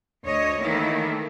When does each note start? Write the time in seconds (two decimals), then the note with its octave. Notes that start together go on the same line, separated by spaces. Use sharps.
0.24 D2 C#5 D#5
0.62 D#3 E3 A3 A#3 E4